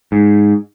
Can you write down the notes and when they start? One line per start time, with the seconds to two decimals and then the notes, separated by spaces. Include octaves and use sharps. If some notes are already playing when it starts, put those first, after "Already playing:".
0.12 G#2